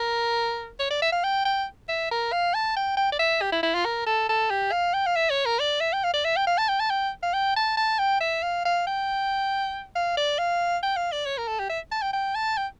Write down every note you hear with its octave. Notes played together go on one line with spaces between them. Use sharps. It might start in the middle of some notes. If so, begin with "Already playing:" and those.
Already playing: A#4
C#5
D5
E5
F5
G5
G5
E5
A#4
F5
A5
G5
G5
D5
E5
G4
E4
E4
F4
A#4
A4
A4
G4
F5
G5
F5
E5
C#5
A#4
D5
E5
G5
F5
D5
E5
G5
F5
A5
G5
A5
G5
F5
G5
A5
A5
G5
E5
F5
F5
G5
F5
D5
F5
G5
F5
D5
C#5
A#4
A4
G4
E5
A5
G5
G5
A5
G5